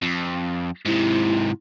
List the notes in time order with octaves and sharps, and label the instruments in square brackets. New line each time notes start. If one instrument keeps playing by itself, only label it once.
[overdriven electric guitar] F2
[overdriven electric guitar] G#2 C3 [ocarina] E4